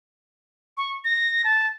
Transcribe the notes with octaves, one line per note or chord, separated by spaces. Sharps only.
C#6
A#6
A5